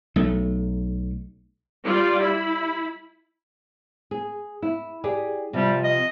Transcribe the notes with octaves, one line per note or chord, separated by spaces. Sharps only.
B1 A3
G3 F4 D5
E4 B5
G#4
E4
G4 G#4 D5
C3 F3 G3
D#5